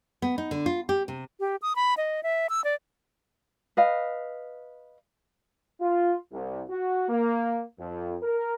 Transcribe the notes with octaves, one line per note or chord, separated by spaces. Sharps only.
B3
D#4
D3
F4
G4
C3
G4
D#6
B5
D#5
E5
E6
D5
B4 D#5 F5
F4
C2
F#4
A#3
F2
A#4